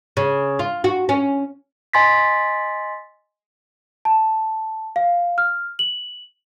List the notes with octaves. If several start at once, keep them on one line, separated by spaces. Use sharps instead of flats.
C#3
F4
F#4
C#4
D#5 G#5 C6 A6 B6
A5
F5
F6
F#7